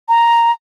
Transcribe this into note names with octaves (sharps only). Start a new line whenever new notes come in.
A#5